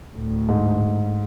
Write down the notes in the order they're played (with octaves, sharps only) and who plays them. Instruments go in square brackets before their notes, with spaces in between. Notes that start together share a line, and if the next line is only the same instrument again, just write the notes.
[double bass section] D2 A2
[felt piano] G#2